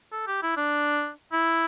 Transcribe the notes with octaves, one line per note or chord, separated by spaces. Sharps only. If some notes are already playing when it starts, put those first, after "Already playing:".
A4
G4
E4
D4
E4